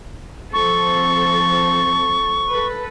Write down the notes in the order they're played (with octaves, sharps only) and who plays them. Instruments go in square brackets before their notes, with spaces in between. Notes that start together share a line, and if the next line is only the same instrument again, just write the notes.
[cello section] F3 C4 A4 [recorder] C#6
[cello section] A4 B4